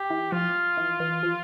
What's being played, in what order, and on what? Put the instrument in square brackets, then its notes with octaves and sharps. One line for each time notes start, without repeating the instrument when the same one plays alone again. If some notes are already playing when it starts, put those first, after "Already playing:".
Already playing: [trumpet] G4
[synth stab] E3
[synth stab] F3 [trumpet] F4
[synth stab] E3
E3
F3